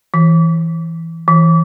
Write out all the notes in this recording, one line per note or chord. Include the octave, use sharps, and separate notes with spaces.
E3
E3